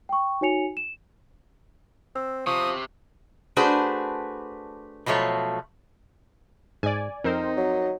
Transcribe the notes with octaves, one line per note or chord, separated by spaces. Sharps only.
G5 C#6
D#4 F#4 C#5 G#5 C#7 F7
E7
C4 E6
C3 F3 C#6 D#6
A3 D4 F#4 G#4 B4 C5
B2 F3 F#3 A3 C#5
G#2 D5 G#5
F2 C4 D#4 A#4 C5
F#3